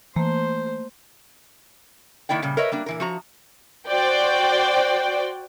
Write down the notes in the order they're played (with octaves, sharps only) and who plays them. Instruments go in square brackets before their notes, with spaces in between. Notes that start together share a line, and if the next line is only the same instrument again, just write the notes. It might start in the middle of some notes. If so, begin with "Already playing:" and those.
[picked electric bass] E3 [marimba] A3 A#3 [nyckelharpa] C5
[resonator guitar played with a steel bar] D#3 A#3 E4 D5 G5
A#2 C#3 G3
A#4 B4 C#5 D#5 E5
G3 A#3 D4
A#2 E3 A#4
F3 F#4 A#5
[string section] F#4 C5 D5 G5